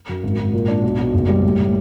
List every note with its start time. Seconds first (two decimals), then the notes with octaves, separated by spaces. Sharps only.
0.09 F#2
0.23 G#1
0.39 G#1
0.53 A#2
0.68 D4
0.83 B1
0.99 B1
1.14 F#1
1.29 G3
1.44 A2
1.59 A2